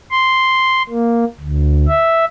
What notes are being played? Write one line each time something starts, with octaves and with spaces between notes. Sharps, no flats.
C6
A#3
D2
E5